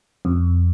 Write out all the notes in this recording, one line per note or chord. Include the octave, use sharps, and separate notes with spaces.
F2